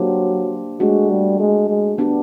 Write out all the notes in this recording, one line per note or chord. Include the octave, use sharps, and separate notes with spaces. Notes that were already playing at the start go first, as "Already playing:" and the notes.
Already playing: F#3 A#3 D4 G4 C5
G#3 A3 D4 F#4
G3
G#3
G#3
B3 D4 G4